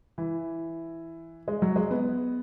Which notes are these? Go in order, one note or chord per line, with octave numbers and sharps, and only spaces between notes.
E3
G#3
F#3
G#3
B3